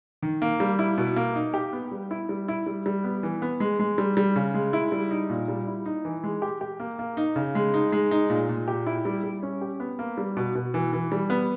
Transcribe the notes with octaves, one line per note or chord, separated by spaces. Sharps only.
D#3
A#3
G3
E4
B2
A#3
D#4
G4
B3
G3
E4
G3
E4
G3
G3
B3
E3
B3
G#3
G#3
G3
G3
C#3
G#3
E4
G3
D#4
A#2
G3
E4
D#4
E3
G#3
G4
G4
A#3
A#3
D#4
C#3
G#3
D#4
G#3
D#4
A#2
A#2
G4
E4
G3
G3
C#4
G4
B3
A#3
G3
B2
B2
E3
E3
G3
B3